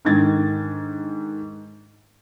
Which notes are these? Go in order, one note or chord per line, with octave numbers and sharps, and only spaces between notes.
G#2 D3 D#3 G#6 A6